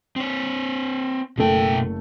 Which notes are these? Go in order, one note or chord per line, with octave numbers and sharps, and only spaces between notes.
C4 C#5
F#1 B2 A3 G5